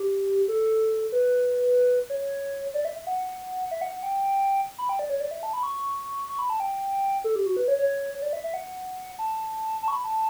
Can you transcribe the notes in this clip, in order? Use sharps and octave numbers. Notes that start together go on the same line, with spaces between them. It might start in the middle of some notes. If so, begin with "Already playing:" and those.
Already playing: G4
A4
B4
C#5
D5
E5
E5
F#5
E5
F#5
F#5
G5
B5
G5
D5
C#5
D5
E5
A5
B5
C#6
C#6
B5
A5
G5
A4
G4
F#4
B4
C#5
C#5
C#5
D5
E5
E5
F#5
A5
A5
C#6
B5
A5